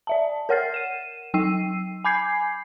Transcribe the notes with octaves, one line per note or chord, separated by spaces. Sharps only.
D5 E5 A5
A#4 C#5 F#5 F6 A6 C7
D#7 E7
F#3 D#4 G5 E6 C7 D#7
G#5 B5 D6 G6 G#6 C7